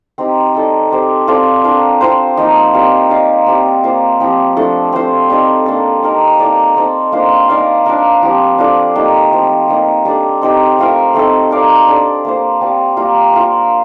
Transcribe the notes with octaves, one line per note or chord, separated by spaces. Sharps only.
C4 D#4 G4
D#4 A4 D5
C4 G4 C5
C4 F4 A4 D5
D4 F4 A#4
C4 F4 C5
F3 A#3 D#4
G3 C4 F4 A#4
D#4 A#4 D5 F5
C4 G4 D5
A#3 F4 C5
F3 C4 G4
F3 A3 D4 A4
C4 F4 C5
G3 C4 D#4 A4
A#3 D4 A4
D#4 G4 A#4
A#3 D#4 A4 D5
C4 D#4 A4 D5
A#3 D4 F4 C5
D#4 A#4 D5 F5
D4 F4 A#4 F5
F3 C4 G4
D4 F4 A4 D5
A#3 D#4 G4
F3 A3 C4
G3 A#3 D#4
G3 D4 A4 D5
C4 D#4 G4
A3 C4 F4 A#4
A3 C4 D#4 A4
D#4 A#4 D5 F5
D4 A4 D5
A#3 F4 C5
C4 G4 D5 F5
G3 A#3 F4 A#4
A#3 F4 A#4